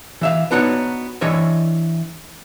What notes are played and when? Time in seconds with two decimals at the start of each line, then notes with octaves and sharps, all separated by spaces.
0.21 E3 E5 F5
0.51 B3 D4 D#4 F#4 C#5
1.21 E3 D4 C#5 D#5 E5